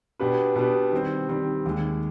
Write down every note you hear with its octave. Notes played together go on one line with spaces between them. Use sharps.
B2 B3 D4 G4 B4
B2 B3 D4 G4 B4
D#3 G3 C4
D#3 G3 C4
D#2 D#3 G#3